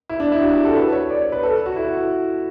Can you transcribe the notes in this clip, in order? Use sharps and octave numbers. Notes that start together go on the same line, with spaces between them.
E4
D4
E4
F#4
G4
A4
B4
C#5
D5
C#5
B4
A4
F#4
E4